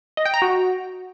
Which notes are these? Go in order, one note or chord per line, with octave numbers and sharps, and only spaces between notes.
D#5
G5
A#5
F#4